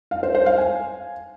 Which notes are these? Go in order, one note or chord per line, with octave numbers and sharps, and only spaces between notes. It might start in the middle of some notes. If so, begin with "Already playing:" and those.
F5
C5
C5
F5
G#5